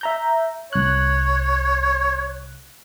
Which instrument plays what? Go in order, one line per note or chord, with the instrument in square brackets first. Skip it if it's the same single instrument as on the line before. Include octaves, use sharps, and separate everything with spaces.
[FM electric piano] E5 A#5 G6
[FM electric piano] C2 F#6 [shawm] C#5